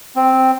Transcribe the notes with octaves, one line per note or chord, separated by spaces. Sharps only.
C4